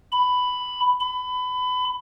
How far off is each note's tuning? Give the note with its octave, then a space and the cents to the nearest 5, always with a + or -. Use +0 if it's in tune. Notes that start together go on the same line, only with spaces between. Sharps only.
B5 +10
B5 +25